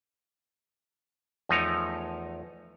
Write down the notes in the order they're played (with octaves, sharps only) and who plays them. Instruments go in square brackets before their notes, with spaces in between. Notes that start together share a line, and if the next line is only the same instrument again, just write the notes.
[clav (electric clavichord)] E2 F3 A3 D#4 A#4 C#5